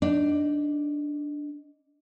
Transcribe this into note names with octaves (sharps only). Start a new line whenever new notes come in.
D4 D#4